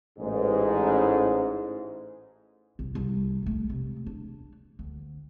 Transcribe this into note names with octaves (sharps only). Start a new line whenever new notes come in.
A1 G#2
C2
C2
A#1 A3
C3
D4
D2